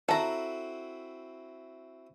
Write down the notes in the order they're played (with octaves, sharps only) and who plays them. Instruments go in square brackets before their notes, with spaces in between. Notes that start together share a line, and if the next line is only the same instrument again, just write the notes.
[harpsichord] C4 E4 F#4 [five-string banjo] A4 A#5